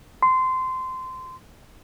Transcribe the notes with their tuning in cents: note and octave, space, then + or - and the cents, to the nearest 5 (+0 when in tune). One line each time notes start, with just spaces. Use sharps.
C6 -20